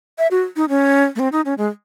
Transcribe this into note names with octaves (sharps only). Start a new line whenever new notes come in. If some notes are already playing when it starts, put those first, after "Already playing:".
E5
F#4
D#4
C#4
A3
C4
D#4
C#4
G#3